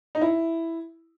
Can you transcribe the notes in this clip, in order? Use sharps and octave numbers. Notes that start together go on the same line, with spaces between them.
D#4
E4